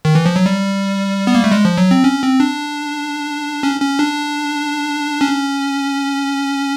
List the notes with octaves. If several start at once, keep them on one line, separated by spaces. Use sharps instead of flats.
D#3
E3
F3
F#3
G3
B3
A#3
A3
G#3
F3
F#3
C4
C#4
C4
D4
C#4
C#4
D4
C#4